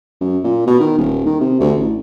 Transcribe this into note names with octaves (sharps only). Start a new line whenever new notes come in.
F#2
A#2
B2
D#3
D#1
D#3
C3
D2
A1